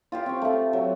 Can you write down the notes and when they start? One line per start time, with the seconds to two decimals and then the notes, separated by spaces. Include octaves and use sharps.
0.12 F4 G4 F5
0.26 C4 C#6
0.42 A3 F5
0.73 F#3